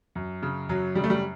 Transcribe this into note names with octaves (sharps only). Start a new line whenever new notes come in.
F#2
C#3
F#2 F#3
C#3 G3
A3
G3